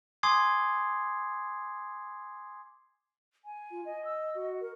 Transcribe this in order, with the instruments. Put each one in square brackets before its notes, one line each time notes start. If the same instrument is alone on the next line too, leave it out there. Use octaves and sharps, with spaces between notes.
[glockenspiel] G#5 C6 D6 D#6 G#6 C7
[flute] G#5
[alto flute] F4
D#5
[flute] E6
F#4
[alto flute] A#4